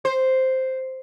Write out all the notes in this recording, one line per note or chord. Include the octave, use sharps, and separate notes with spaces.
C5